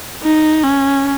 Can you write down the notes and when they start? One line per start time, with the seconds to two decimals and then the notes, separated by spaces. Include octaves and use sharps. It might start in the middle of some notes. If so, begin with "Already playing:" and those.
0.23 D#4
0.64 C#4